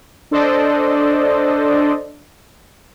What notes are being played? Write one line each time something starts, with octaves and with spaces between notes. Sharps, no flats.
D4 A4 C5 D5 D#5